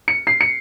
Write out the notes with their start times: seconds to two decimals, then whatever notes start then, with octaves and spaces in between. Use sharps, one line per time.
0.08 C#7
0.27 C7
0.41 C#7